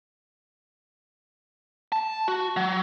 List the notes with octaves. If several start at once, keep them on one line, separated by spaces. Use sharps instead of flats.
A5
F#4
F#3